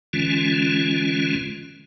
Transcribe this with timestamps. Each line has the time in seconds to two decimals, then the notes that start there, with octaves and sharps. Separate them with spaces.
0.13 D3 E3 G#3 C#4 F4